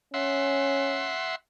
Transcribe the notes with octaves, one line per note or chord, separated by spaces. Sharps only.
C#4 E5 F#5 C6